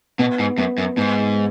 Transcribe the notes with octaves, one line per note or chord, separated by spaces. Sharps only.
B2 B3
G#2
F#2 B3
F#2
G#2 B3